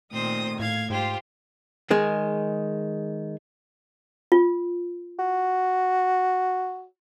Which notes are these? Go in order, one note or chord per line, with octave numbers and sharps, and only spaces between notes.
A#2 D#3 A3 C4 C5 D#6
A2 F5 G#6
G#2 F4 G4 C5
D#3 G#3 G#4
F4
F#4